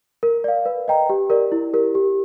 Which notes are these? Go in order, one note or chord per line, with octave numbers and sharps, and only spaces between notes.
A#4
D5 F5
B4
D#5 G5 A#5
G4
A#4 D5
E4
G4 A#4
G4